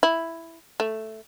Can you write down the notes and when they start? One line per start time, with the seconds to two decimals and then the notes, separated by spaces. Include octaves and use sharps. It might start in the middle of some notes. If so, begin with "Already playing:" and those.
0.03 E4
0.80 A3